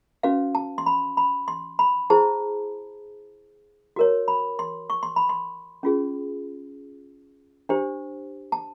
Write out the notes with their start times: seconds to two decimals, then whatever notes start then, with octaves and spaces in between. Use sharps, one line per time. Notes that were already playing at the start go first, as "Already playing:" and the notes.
0.23 C#4 F#4 B4 F5
0.55 A5
0.78 C6
0.86 B5
1.17 B5
1.48 C6
1.79 B5
2.10 E4 G#4 C5 A5
3.96 F#4 A#4 C#5
4.28 B5
4.59 C6
4.90 C#6
5.03 C6
5.16 B5
5.29 C6
5.83 C#4 F4 G#4
7.69 D4 G4 C5
8.52 A5